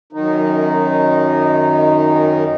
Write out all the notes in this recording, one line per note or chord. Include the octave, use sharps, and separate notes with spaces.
F#2 D#3 D#4